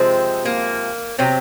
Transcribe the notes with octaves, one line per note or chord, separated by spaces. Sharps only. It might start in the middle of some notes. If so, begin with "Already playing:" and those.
Already playing: C3 F3 G#3 C4
A#3
C3 F#3 C4